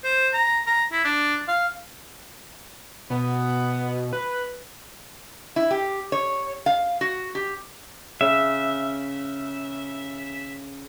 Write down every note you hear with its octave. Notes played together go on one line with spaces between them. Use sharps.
C5
A#5
A#5
E4
D4
F5
B2 B3
B4
E4
G4
C#5
F5
F#4
G4
C#3 E5